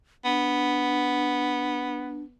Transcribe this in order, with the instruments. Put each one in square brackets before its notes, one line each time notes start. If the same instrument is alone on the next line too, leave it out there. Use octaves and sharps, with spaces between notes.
[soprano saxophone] B3 [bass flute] D4